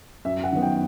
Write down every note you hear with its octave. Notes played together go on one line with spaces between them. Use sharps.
F#2 E5
F#5
D#3 F#3 B3
G5